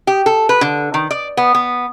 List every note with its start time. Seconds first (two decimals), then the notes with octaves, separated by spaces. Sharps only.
0.07 G4
0.26 A4
0.49 B4
0.61 D3
0.94 D#3
1.11 D5
1.37 B3
1.55 B3